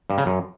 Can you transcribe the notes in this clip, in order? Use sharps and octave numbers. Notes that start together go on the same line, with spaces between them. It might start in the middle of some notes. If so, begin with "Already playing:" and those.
G2
C#3
F#2